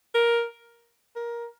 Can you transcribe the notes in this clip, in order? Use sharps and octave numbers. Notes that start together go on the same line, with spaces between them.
A#4
A#4